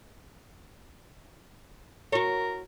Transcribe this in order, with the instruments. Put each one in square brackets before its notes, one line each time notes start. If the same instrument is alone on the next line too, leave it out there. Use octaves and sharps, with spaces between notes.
[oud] F#4 C#5 [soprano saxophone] A#4